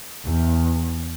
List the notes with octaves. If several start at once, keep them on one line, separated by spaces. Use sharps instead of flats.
E2